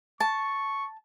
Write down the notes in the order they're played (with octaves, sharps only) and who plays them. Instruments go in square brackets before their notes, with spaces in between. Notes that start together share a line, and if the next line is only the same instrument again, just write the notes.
[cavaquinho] A5 [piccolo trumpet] C#6